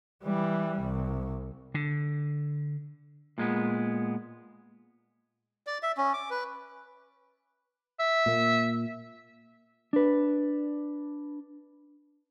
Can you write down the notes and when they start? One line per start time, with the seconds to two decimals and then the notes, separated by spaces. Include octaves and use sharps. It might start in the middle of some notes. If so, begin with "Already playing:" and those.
0.24 E3 G3
0.79 C2
1.74 D3
3.38 A#2 G#3 B3
5.67 D5
5.83 E5
5.97 C#4
6.13 D6
6.30 B4
8.00 E5
8.26 A#2 A#3
9.93 D4 B4